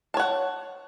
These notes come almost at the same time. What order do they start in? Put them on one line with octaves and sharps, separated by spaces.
A5 C#5 F#5